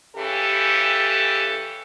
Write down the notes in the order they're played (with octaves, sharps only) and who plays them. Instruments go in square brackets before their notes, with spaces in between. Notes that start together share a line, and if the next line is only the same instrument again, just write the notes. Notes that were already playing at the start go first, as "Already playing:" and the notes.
[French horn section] C#3 E3 G4 A4